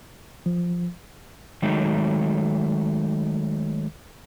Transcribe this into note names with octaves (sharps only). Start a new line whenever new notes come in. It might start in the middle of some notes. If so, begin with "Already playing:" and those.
F3
D#3 F#3 G#3 A3 D#4